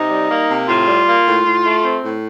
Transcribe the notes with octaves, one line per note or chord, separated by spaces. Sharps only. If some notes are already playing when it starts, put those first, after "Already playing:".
Already playing: C3 D#4
G3
A#3
C3
A2 F4
G3
A#3
A2
A2
A3
C4
A2